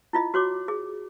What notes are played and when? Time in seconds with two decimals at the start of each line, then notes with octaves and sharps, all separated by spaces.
0.13 E4 F4 D#5
0.34 F#4 C#5 D6
0.68 G#4